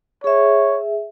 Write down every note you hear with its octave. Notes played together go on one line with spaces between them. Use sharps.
G#4 C#5 E5